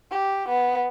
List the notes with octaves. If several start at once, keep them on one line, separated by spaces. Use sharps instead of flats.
G4
B3